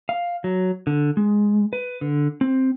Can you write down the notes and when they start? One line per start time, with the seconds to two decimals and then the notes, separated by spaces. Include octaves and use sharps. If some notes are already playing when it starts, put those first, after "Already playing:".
0.09 F5
0.44 F#3
0.87 D3
1.17 G#3
1.73 B4
2.01 D3
2.41 C4